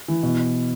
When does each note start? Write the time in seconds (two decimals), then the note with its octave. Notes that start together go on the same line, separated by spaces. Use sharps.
0.08 E3
0.23 B2